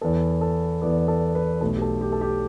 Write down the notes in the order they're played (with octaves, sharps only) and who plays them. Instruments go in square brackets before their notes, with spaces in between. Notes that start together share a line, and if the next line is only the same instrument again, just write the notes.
[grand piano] E2 E3 B3 A4
A4
E2 E3 B3 D5
A4
B4
B1 B2 A3 A4
G4
A4
G4
A4
G4